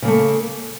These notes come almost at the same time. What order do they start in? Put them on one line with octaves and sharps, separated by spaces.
C#3 A#3 A3